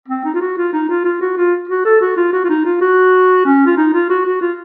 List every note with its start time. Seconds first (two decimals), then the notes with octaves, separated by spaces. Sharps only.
0.08 C4
0.24 D#4
0.34 F4
0.41 F#4
0.57 F4
0.73 D#4
0.89 F4
1.04 F4
1.21 F#4
1.37 F4
1.69 F#4
1.85 A4
2.01 F#4
2.17 F4
2.33 F#4
2.44 F4
2.49 D#4
2.65 F4
2.81 F#4
3.45 C#4
3.66 F4
3.77 D#4
3.93 F4
4.09 F#4
4.25 F#4
4.41 F4